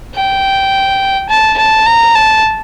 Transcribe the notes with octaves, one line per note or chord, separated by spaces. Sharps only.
G5
A5
A5
A#5
A5